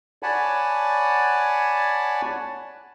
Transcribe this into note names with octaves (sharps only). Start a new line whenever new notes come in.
C#5 D5 F#5 G#5 A5 B5